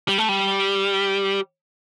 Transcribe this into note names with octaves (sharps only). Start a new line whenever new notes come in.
G3
A3
G3